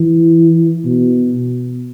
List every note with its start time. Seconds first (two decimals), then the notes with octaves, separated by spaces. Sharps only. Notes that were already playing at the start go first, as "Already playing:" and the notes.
Already playing: E3
0.85 B2